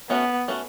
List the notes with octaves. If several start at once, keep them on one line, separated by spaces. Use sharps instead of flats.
A3 B3 C#4 F#4
A3 C#4 F#4